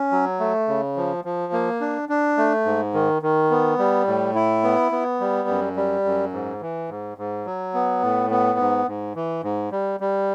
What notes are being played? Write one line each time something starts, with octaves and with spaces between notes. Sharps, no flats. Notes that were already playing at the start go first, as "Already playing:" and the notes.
Already playing: C#4
F#3
A3
C#3
F3
F3
A#3
D4
D4
A3
G#2
D#3
D#3
B3
G3
A2
E4
B3
B3
G3
F#2
G3
F#2
G#2
E3
G#2
G#2
F#3
B3
A2
B3
G#2
G#2
E3
G#2
G3
G3